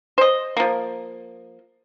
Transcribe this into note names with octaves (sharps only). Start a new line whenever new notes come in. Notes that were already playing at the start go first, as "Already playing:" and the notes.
C5 D#5
F3 A#3